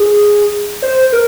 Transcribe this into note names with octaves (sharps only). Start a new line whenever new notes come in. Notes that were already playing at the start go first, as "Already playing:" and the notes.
Already playing: G#4
C5
A#4